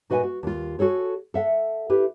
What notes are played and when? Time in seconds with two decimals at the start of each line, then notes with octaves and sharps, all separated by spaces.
0.10 A#2 F#4 B4 D#5 F#5 G#5
0.23 F#4
0.43 D#2 F4
0.79 F#4 G#4 A4 C#5
1.34 A4 E5 F#5
1.90 E4 G4 B4